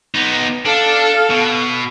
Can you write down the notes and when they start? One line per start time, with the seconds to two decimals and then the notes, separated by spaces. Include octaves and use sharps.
0.15 B3 D#4
0.65 D4 A4 F5
1.30 B2